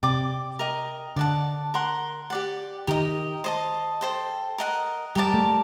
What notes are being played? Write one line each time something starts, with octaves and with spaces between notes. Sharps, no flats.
C3 D5 G5 D6
A#4 D#5 G5
D3 D5 F#5 A5
A#4 F#5 C6
G4 D5 F#5
D#3 G4 A#4 D#5
C5 D#5 A5
A4 C5 G5
A#4 D#5 F#5
G3 G4 A#4 D5 A5
A3